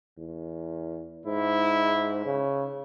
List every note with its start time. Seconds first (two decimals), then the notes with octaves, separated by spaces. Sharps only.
0.18 E2
1.26 G#2 E4
2.26 C#3